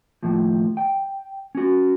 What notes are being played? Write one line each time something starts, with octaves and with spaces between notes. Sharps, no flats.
D#2 A2 F3
G5
C#4 F#4